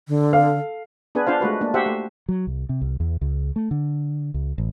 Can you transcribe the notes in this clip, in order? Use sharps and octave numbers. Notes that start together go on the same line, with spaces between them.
D3
A4 F5
B3 D4 G#4 B4 G#5
D4 F4 C5 F5
G#3 A3 F#4 B4
A#3 D4
F#4 G4 C5 E5 F#5
A3
F#3
C2
C3
C2
E2
C#2
A3
D3
C#2
A1